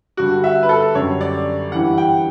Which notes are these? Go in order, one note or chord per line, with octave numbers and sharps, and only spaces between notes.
G2 D3 G3 F#4
E5
B4
A4
F#2 D3 G3 C#5
D5
G2 E3 G3 F#5
G5